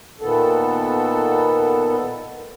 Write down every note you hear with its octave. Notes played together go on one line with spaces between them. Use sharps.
A#2 D#3 B3 A4